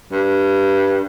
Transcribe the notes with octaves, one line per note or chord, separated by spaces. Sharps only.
G2